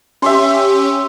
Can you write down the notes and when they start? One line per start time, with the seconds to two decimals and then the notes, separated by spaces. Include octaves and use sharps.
0.22 C#4 G4 E5 C6